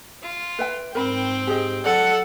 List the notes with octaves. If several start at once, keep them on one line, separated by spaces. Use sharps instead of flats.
F4
B4 E5 G5
G#2 C4 A#4 G5 B5
G4 G#4 D#5
F#3 A4 D5 F#5